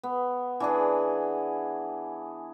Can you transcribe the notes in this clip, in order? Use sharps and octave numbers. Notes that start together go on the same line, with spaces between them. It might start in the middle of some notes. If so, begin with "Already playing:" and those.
B3
E3 D4 G#4